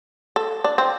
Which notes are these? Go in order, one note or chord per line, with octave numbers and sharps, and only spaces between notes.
A4
D4
C4